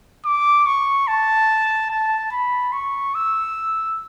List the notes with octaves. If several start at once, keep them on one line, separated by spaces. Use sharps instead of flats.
D6
C#6
A5
A5
B5
C#6
E6